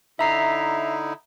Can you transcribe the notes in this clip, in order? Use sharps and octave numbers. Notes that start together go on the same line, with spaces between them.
D3 D#4 E4 E5 A#5 C7